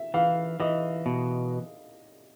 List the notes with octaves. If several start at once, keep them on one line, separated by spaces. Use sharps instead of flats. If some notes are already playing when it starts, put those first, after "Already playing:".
Already playing: E5
E3 F5
E3 D#5
B2